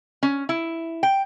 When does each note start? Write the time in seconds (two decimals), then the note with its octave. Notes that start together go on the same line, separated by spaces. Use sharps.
0.23 C#4
0.49 E4
1.03 G5